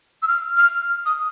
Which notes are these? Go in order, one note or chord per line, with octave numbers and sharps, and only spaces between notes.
E6
F6
F6
D#6